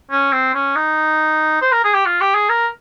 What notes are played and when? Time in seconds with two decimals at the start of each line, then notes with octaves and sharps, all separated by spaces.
0.11 C#4
0.32 C4
0.54 C#4
0.76 D#4
1.62 C5
1.72 A#4
1.84 G#4
1.95 G4
2.06 F4
2.21 G4
2.35 G#4
2.49 A#4